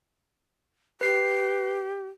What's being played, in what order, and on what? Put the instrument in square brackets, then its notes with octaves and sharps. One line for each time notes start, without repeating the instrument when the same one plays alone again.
[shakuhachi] G4 [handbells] B4 C7